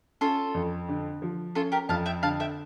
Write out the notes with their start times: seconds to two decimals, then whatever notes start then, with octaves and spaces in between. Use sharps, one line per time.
0.21 C#4 F4 A4
0.54 F2
0.89 D3
1.22 F3
1.55 C#4 F4 A4
1.72 G4 A#4
1.89 F2 F5 A5
2.06 E5 G5
2.23 D3 F5 A5
2.40 E5 G5